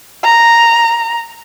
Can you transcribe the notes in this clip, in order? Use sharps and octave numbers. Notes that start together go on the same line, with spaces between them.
A#5